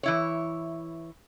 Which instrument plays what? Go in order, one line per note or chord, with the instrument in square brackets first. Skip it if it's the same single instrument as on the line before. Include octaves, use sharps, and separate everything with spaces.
[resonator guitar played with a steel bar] E3 E4 C#5